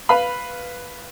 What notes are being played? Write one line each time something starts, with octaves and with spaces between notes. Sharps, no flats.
B4 F5 B5